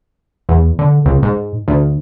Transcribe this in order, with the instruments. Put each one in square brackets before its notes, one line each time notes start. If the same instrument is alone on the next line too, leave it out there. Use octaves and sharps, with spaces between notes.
[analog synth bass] E2
D3
C#2
G#2
D2